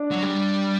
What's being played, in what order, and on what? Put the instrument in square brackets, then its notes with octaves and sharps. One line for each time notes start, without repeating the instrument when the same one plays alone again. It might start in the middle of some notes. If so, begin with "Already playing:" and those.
Already playing: [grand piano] D4
[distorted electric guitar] F#3
G3